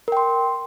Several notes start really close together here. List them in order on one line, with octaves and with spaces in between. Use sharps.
A#4 G5 C6